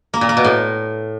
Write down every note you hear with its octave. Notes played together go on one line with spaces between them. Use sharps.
A#3
A#2
A#3
B2
A2